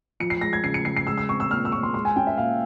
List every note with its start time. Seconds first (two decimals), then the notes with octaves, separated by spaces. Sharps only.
0.20 F3 C#7
0.30 C7
0.41 G#3 A#6
0.53 G#6
0.64 C#3 C7
0.74 C#7
0.85 C#3 C7
0.97 C7
1.07 G#3 E6
1.18 E6
1.29 C4 C#6
1.40 E6
1.50 A#2 F6
1.65 E6
1.72 A#2 C#6
1.83 C6
1.94 G#3 C6
2.05 G#5
2.16 C#4 G5
2.27 E5
2.38 A#2 F5